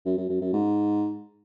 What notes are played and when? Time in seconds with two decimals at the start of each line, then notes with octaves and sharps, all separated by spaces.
0.06 F#2
0.17 F#2
0.29 F#2
0.41 F#2
0.53 G#2